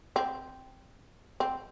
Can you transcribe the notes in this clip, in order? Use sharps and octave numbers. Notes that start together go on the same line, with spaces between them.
C4
C4